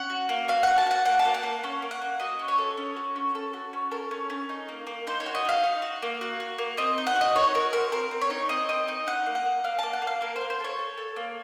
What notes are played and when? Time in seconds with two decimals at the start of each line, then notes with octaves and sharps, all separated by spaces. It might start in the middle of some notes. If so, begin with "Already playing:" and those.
Already playing: C#4 F#5
0.10 F#4
0.29 A#3
0.48 F#4 F5
0.63 F#4 F#5
0.78 A5
0.86 F#4 F#5
1.05 A#3 F#5
1.19 A5
1.25 A#3
1.34 F#5
1.43 A#3
1.64 C#4
1.82 A#3
1.91 F#5
2.02 A#3
2.20 F#4 D#5
2.39 C#4
2.48 C#5
2.58 A4
2.77 C#4
2.96 F#4
3.16 C#4
3.35 A4
3.53 F#4
3.73 C#4
3.91 A4 A#4
4.11 C#4
4.30 C#4
4.49 D#4
4.69 A#3
4.87 A#3
5.07 D#4 C5
5.20 C#5
5.26 F#4
5.35 D#5
5.45 D#4 F5
5.64 D#4
5.82 F#4
6.02 A#3
6.21 F#4
6.40 F#4
6.58 A#3
6.77 C4 D#5
6.98 D#4
7.07 F#5
7.16 F#4
7.21 D#5
7.35 D#4 C#5
7.54 F#4 A#4
7.73 C4 A#4
7.92 C4 A#4
8.11 C4
8.21 C#5
8.30 D#4
8.49 C4 D#5
8.69 C4 D#5
8.88 D#4 D#5
9.07 D#4 F#5
9.26 A#3
9.35 F#5
9.45 A#3
9.64 A#3 F5
9.79 A#3 A5
9.93 F#5
10.02 A#3
10.07 F5
10.21 A#3 A#4
10.36 C5
10.41 A#3
10.50 C5
10.60 A4 C#5
10.79 A4
10.98 A4
11.16 A#3